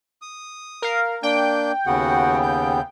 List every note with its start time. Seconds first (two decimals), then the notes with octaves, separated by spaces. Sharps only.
0.22 D#6
0.82 A#4 F5
1.23 A#3 D4 G5 G6
1.86 D#2 C#3 B3 F#4 F#5
2.43 G6